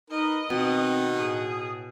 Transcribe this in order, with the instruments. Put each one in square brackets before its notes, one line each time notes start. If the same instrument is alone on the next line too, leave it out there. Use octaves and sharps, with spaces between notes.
[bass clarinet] D#4 [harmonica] A#4 B4 [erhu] D#5
[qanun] B2 [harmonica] D#3 D#4 F#5 [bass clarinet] C4
[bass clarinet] A2 [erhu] G#4